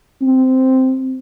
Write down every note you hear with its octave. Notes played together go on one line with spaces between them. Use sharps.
C4